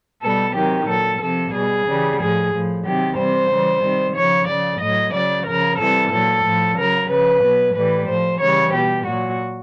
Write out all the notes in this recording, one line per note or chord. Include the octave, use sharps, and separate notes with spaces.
B2 G3 A4
C3 D#3 F#3 G4
A#2 F#3 A4
C3 F3 A4
B2 G3 G#4
C#3 E3 G3
A2 F3 G#4
A2 F3
C3 D#3 F#3 G4
C3 E3 G3 C5
C#3 E3 G3
C3 D#3 G3
C#3 F3 C#5
C#3 F3 D5
A2 F#3 D#5
C#3 F#3 D5
C#3 F3 A#4
C3 E3 G3 A4
A#2 F#3 A4
A2 F3
C#3 F#3 A#4
C#3 F3 B4
B2 F#3
A2 E3 G3 B4
A2 F3 C5
C#3 E3 G3 C#5
B2 G3 G4
A#2 F#3 F#4